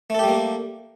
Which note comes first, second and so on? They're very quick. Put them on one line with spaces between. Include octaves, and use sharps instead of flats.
A3 A4 G4 G3 A#3